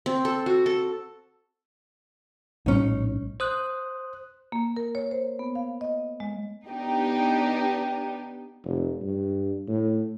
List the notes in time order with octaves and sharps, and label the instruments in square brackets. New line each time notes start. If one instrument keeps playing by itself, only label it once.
[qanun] C4
A4
F#4
A4
[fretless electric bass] A#1 A2 G3 [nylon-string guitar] C#4 D#4
[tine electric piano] C5 D#6 F#6
[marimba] A#3
A#4
C#5
C5
B3
F5
D#5
G#3
[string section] B3 D4 D#4 G4
[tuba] F1
G2
A2